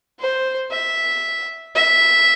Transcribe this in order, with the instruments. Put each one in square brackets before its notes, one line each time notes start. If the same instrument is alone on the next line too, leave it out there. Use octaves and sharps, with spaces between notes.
[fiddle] C5
E5
E5